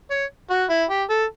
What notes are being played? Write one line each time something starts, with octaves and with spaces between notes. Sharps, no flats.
C#5
F#4
E4
G4
A4